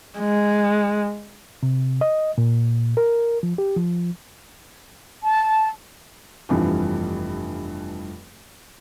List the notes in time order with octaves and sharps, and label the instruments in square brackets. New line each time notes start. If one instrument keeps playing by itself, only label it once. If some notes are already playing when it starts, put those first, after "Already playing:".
[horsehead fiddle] G#3
[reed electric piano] C3
D#5
A#2
A#4
F3
G4
F3
[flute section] A5
[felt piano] F1 G2 E3 F3